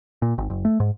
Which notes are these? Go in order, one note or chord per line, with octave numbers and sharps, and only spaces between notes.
A#2
G#1
F#1
A3
G#2